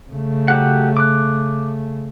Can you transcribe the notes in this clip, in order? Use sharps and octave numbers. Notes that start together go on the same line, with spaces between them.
C#3 A3
F#3 G4 F#5
D6 F#6